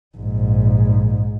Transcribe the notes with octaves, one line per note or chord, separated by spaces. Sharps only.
A#1 G#2